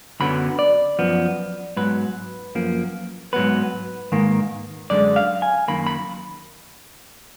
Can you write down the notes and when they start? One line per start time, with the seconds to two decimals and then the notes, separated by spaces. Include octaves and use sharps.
0.20 F#2 D3 F#3 B3 B5
0.59 D5
0.99 F#2 F3 B3
1.77 G#2 F#3 B3 B4
2.55 F#2 F3 A#3
3.33 G#2 F#3 B3 B4
4.12 G#2 D#3 A#3
4.90 F#2 D3 G#3 D5
5.16 F5
5.42 G#5
5.68 F#2 D#3 A#3 B5
5.87 B5